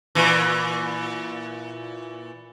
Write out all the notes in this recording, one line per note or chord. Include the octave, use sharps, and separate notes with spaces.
A#2 E3